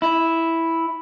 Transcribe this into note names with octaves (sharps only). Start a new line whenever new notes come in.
E4